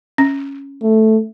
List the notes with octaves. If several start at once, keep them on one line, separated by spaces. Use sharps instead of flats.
C#4
A3